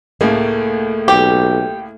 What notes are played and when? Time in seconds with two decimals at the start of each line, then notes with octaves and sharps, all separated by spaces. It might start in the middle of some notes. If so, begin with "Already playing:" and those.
0.21 C#2 A2 A3 A#3
1.08 B1 G4